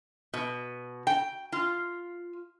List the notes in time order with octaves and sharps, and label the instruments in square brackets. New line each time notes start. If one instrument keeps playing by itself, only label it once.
[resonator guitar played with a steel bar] B2
G5
F4